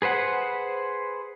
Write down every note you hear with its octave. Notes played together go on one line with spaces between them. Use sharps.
G#4 B4 C5 F#5